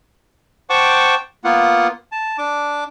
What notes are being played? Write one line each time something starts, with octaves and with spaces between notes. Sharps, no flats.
C5 F#5 G5 A5 C#6 D6
A#3 B3 F4 F#5
A5
D4 D6